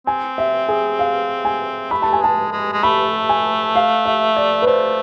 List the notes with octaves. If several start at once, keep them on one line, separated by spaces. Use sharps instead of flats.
C4 G#5
E5
G#4
F5
G#5
A3 B5
A5
G#5
G#3 A5
G#3
G#3
A3 B5
G#5
F5
E5
D5
B4
A3 C5